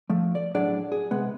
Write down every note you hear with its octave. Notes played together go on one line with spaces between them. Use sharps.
F3 A3
D5
A2 F#3 D4 G#4 D5
G#4
C3 G#3 B3